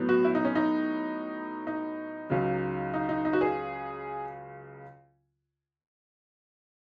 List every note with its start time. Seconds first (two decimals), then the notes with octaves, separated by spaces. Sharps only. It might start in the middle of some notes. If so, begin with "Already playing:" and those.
Already playing: A2 F#3 B3
0.09 F#4
0.25 E4
0.35 D#4
0.45 C#4
0.55 D#4
1.67 D#4
2.30 C#2 C#3 F#3
2.94 D#4
3.09 D#4
3.25 D#4
3.33 F#4
3.41 G#4